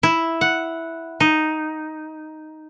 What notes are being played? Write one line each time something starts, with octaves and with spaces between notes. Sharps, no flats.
E4
F#5
D#4